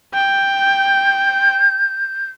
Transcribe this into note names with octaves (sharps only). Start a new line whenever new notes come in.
G5 G6